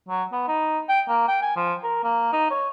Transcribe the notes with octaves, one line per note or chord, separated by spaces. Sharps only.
F#3
B3
D#4
G5
A#3
G5
G#5
F3
A#4
A#3
D#4
C#5